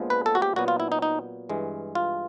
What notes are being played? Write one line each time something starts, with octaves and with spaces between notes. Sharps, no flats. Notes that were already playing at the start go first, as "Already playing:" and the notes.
Already playing: A#1 A#2 F3 G#3 B3
B4
A4
F#4
G4
A#2 F#3 B3 F#4
F4
E4
D#4
D#4
G2 E3 G#3
F4